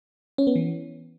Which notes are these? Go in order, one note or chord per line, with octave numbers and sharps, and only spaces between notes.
C#4
B3
E3